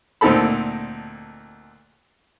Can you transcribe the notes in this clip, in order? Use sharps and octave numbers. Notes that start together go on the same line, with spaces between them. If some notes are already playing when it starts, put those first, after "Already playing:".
D2 A#2 C4 D#4 A4 B5